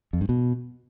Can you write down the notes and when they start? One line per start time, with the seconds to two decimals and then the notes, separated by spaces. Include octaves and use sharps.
0.13 F2
0.21 G2
0.29 B2